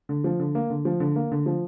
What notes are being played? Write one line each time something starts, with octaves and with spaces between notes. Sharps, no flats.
D3
F3
D3
A#3
D3
F3
D3
A#3
D3
F3